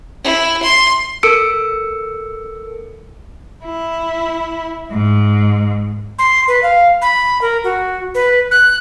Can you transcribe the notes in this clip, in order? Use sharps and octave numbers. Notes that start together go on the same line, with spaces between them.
E4
C6
A4 A#4 E6 C#7 D7
E4
G#2
C6
B4
F5
B5
A#4
F#4
B4
F#6